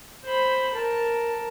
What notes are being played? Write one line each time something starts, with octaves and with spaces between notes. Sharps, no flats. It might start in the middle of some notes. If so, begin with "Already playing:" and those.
C5 B5
A#4 A5